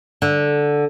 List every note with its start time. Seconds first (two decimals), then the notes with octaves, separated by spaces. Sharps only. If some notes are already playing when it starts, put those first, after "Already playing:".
0.22 D3